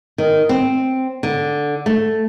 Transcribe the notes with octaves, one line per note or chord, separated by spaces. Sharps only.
D#3
C4
D3
A3